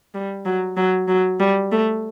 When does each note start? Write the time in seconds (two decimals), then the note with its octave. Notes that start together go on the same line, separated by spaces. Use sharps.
0.14 G3
0.45 F#3
0.76 F#3
1.08 F#3
1.40 G3
1.72 A3